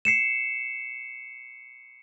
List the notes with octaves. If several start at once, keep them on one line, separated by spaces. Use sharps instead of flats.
C7 C#7 E7